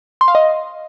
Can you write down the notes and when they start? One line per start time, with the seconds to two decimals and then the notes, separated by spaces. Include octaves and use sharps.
0.21 C6
0.28 F5
0.35 D#5